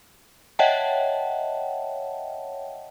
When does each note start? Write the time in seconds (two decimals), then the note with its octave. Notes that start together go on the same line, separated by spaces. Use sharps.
0.59 C#5 D#5 E5 F#5 G5 A5